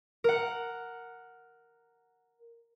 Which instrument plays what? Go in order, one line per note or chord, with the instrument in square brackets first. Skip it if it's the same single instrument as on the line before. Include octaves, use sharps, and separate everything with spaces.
[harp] A#4 F#5